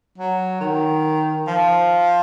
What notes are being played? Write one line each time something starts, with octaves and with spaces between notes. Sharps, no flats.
F#3
D#3
F3